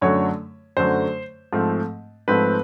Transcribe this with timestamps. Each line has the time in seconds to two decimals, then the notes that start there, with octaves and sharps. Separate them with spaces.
0.01 F#2 D3 F#3 A3 C#5
0.77 F#2 D3 F#3 A3 C5
1.53 G#2 F3 A3 C4
2.28 G#2 F3 A3 C4 B4